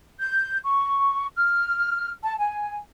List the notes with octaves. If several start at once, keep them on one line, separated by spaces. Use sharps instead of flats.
G6
C#6
F6
A5
G#5